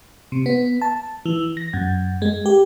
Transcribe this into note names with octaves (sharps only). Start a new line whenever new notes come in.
C3
B3
A5
E3
A#6
F#2
G#3
G4